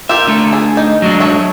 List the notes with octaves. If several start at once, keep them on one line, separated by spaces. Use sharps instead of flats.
F4 G4 A#4 E5
D3 A3 A4
G#4
D#4
F#3 G#3 D4
A4 C#5 E5